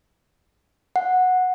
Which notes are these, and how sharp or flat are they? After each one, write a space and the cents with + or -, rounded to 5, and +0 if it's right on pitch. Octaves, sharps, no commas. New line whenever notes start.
F#5 -10